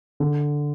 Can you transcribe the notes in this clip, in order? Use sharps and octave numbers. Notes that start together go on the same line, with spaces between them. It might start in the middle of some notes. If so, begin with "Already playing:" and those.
D3